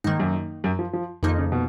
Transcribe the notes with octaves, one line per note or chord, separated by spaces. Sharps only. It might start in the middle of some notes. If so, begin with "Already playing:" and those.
G#2 D#3 A#3 D#4
F#2
F#2
F3
F3
F2 D#3 F3 A#3 D#4
C#3
B2